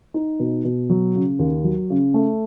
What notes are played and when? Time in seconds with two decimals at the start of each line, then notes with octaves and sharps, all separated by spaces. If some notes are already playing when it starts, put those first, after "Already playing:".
0.14 D#4
0.40 B2
0.65 B2
0.90 F#3
1.15 C#3
1.39 D#2
1.64 F#3
1.90 C#3
2.14 A3